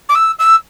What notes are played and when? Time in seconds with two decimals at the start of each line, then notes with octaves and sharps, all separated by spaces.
0.09 D6
0.15 E6
0.39 E6